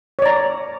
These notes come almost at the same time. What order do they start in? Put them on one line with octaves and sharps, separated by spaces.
C#5 D5 A#5